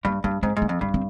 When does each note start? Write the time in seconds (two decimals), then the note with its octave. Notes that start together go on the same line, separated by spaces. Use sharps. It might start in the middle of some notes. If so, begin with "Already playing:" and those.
0.05 G2 A#3
0.24 G2 A#3
0.43 G#2 C4
0.57 G#2
0.62 A#3
0.69 F2
0.81 G2 C4
0.94 C4